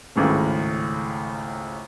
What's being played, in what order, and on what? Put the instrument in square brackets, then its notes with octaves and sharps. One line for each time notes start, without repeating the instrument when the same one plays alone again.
[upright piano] G#1 C#2 A2 C#3